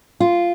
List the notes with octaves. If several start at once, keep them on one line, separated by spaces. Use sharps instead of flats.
F4